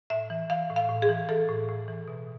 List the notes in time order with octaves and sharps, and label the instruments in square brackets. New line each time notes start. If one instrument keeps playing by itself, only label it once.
[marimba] A2 E5
E3
E3 F5
A2
F5
A2
G#4
E3
E3 A4
A2
A2
E3
B2